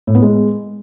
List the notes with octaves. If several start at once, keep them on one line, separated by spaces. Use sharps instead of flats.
A2
B3
G#3